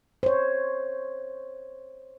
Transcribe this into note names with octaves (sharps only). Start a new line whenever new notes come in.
C5 C#5